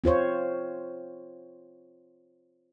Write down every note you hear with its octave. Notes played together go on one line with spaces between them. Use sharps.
C4 F4 C5 C#5